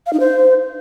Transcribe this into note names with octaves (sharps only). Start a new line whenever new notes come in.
F5
D#4
C5